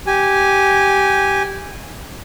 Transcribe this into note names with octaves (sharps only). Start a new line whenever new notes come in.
G4 G#5